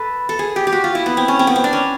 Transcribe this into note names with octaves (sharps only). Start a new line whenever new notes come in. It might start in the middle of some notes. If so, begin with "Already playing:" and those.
Already playing: A4 B4
A4
G#4
G4
G4
F#4
F4
E4
B3
C4
C#4
C4
B3
C4
D4
C#4